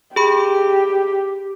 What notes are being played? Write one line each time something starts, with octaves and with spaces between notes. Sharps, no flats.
G4 G#4 B5